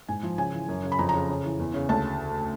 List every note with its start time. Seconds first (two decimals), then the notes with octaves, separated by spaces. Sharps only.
0.08 G#2 G#5
0.23 F3
0.38 C#3 G#5
0.53 E3
0.69 F#2
0.83 C#3
0.92 B5
0.99 F2 A#5
1.09 C#3 A#5
1.29 C#3
1.44 E3
1.59 E2
1.74 C#3
1.89 D2 A5